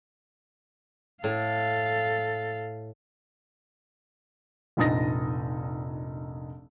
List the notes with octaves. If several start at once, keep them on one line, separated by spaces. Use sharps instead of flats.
A2 A4 F5
F1 A#1 D#4 D#6 A6 A#6